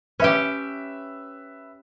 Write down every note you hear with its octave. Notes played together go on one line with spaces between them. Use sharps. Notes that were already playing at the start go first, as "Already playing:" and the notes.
C#4 G4 B4 E5